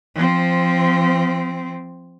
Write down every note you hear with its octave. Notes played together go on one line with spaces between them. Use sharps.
F3 C4